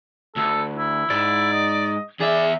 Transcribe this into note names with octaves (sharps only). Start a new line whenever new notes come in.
D2 A4
E4
G#2 D5
D#5
E2 G#4 D5 E5